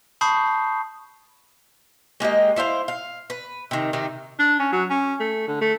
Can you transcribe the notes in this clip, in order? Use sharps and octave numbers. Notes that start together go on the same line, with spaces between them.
A5 B5 C#6 D#6 G6 C7
G#3 A#3 G4 D#5
D4 E4 C5 F5
F5
B4
C3 D#3
C3 D#3 D#4
D4
C#4
F#3
C#4
A3
D3
A3